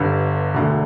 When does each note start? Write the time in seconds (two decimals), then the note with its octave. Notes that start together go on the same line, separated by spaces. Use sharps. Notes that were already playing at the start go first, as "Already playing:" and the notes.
Already playing: G1 G2 D3
0.54 E1 D2 D3